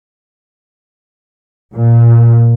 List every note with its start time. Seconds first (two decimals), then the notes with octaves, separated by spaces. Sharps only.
1.75 A#2